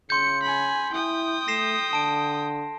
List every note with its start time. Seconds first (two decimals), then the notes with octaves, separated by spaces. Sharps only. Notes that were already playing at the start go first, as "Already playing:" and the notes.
0.10 C#3 C6 G6 C#7
0.42 G#5 B5
0.93 E4 G5 D#6
1.48 A3 A#6 C7 E7
1.93 D3 A5 D7